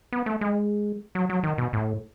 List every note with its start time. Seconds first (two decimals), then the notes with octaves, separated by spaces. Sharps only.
0.13 B3
0.26 A3
0.41 G#3
1.15 F#3
1.29 F#3
1.43 D#3
1.58 B2
1.73 A2